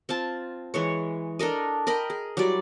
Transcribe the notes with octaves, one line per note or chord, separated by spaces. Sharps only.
C4 F4 A5
E3 G#3 C#5
D4 A4 A#4 D#5
A#4 D#5 G5 B5
G#4
F#3 G3 E4 D5